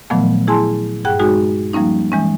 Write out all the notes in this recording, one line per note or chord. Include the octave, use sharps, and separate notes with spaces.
A#2 D#3 F3 F#3 A3 B3
E4 G#4 G#5 A5 C6
G2 G#4 F#5 G5 F#6
G#3 D#4 F#4 G#4
F3 G3 A#3 C#4 D#4
E3 G#3 C#4